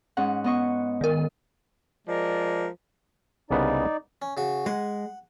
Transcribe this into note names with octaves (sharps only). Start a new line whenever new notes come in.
G#2 C#4 F#5
B3 D#5 C#6
D#3 A#4
F3 G#3 A#4 D5
C2 C#3 B3 D#4 D5
C#4
C#3 F#4
G#3 F#5